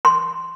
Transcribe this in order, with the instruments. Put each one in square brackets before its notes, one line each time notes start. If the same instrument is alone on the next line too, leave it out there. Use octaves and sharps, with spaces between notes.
[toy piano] C6